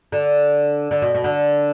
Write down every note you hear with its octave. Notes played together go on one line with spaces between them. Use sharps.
D3
D3
B2
B2
D3